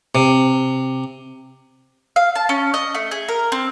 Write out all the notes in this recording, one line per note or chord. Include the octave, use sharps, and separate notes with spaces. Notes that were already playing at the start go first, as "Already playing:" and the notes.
C3
F5
A5
C#4
D#5
A3
G#4
A#4
C4